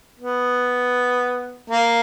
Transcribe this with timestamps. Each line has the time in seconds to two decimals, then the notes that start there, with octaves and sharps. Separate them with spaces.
0.20 B3
1.70 A#3